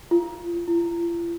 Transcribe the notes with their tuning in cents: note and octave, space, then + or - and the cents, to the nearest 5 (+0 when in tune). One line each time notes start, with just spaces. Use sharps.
F4 -25
F4 -45